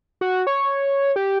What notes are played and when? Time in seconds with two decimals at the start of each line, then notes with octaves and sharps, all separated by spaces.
0.21 F#4
0.47 C#5
1.16 G4